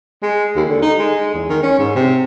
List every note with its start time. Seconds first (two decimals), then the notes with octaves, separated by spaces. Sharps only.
0.22 G#3
0.56 D#2
0.69 D3
0.82 D#4
0.99 G#3
1.34 E2
1.49 D#3
1.63 C#4
1.79 G#2
1.96 C3